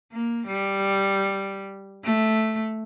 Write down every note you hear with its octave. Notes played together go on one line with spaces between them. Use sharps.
A#3
G3
A3